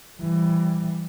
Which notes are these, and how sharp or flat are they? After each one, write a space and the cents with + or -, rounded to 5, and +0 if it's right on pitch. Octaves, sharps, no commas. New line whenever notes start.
E3 +20 G3 +0